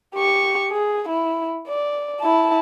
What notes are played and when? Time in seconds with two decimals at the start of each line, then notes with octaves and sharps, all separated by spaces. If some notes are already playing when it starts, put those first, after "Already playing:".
0.15 G4 C#6
0.71 G#4
1.09 E4
1.68 D5
2.21 E4 A5